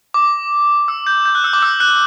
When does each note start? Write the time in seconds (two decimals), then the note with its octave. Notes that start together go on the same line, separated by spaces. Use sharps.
0.14 D6
0.88 E6
1.07 G6
1.25 G6
1.35 F#6
1.44 E6
1.53 D6
1.62 E6
1.80 F#6